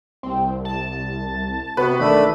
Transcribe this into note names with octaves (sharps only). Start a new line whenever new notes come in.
C2 C4
A5
C3 B3 F#4 B4
E1 D#3 A3 D4 B5